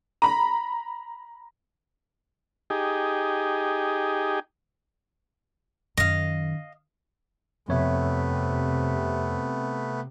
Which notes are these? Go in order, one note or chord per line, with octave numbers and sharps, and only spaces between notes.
A#5 B5
D#4 G4 G#4
F#2 D#3 D#5 F5
F2 C3 A3 B3 C#5 E5